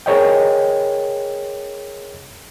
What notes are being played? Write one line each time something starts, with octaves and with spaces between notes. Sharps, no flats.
G#4 A#4 C#5 D#5 G5